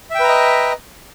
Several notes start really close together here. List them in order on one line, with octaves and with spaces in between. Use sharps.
E5 G5 B4 A#5 D#5